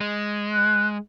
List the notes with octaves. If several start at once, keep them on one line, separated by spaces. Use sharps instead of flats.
G#3
F#6